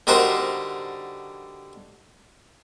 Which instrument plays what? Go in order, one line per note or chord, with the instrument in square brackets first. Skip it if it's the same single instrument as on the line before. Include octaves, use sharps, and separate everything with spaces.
[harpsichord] D3 G3 D#4 F#4 A#4 C5